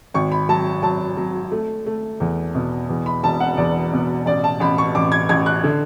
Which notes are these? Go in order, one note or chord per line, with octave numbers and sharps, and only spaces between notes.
G#1 C#6
B5
F#3 A5
F#3 A5
F#3
A3
A3
E2
B2
E2
B5
E1 A5
F#5
E2 D5
B2
A1 D5
A5
A1 B5
C#6
A1 D6
G#6
A1 G#6
F#6
D3